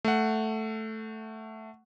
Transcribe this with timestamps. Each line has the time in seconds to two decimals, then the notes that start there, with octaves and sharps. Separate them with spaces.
0.05 A3 F#5